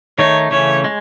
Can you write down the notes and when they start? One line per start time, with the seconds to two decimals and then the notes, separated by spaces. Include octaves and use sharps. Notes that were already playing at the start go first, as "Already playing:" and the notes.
0.18 D#3 A3 D#4 C#5
0.51 C#3 E3 A3 C#4 C#5
0.84 G#3